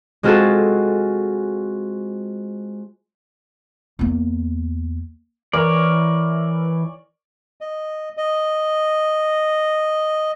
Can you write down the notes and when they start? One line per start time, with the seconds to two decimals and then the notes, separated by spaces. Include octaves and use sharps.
0.23 G#3 C4 F4 F#4 G#4 A4
3.99 E2 A#3
5.53 E3 A#4 C#5 D5
7.61 D#5
8.17 D#5